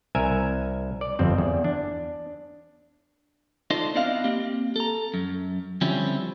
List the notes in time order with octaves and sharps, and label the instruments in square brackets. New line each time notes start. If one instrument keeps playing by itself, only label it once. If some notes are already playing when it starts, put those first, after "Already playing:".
[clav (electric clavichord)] C2 A#4 E5 G#5
D5
G1 F2 C4
E2
D4
[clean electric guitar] D#4 F4 A4 C5 D5 D#5
B3 C4 D4 E4 D#5 F5
A#3 C4 G4
A4 A#5
F#2
D3 F3 G3 C4 C#4 E4